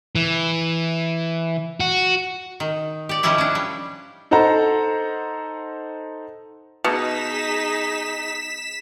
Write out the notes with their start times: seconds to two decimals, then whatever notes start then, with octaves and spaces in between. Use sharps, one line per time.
0.15 E3
1.80 F#4
2.60 D#3
3.09 G4 D5
3.23 D#3 F3 G3 C#4 E4 G4
3.38 C#4 D4
3.55 G3
4.31 D#4 A4 C5 F#5 A#5
6.84 B2 D#4 G#4 B6 E7